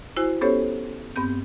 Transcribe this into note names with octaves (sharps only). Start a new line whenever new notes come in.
E4 F#4 C5 G#5
B3 C#4 G4 A4 C5 C#5
G2 B3 C4 G6